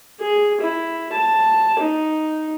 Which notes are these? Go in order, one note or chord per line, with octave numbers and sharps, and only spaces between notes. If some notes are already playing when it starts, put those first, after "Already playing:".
G#4
E4
A5
D#4